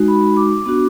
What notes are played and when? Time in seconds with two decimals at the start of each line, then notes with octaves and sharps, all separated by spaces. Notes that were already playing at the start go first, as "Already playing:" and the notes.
Already playing: G#3 D#4 F#4
0.08 B5
0.37 D6
0.66 B3 D4 F#4